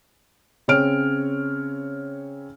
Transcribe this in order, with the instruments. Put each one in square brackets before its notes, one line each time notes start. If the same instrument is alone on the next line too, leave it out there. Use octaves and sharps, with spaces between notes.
[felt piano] C#3 C4 C#5 F6 D7